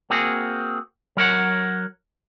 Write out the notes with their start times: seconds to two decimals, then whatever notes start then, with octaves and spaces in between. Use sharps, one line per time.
0.10 A#3 C4 F#4 G#4
1.17 F#3 A#4 C#5 F#5